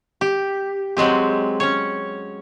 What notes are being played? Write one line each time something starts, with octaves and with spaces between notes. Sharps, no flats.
G4
F#3 G#3 C4 G4
C#4 C#5